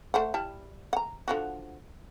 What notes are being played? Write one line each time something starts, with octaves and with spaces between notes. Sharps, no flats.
A3 C5 F#5
G3 E4 A5
F#5 A#5
D3 F3 F#4